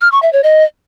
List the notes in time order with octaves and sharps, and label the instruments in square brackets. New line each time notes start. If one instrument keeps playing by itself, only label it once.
[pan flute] F6
C#6
E5
C#5
D#5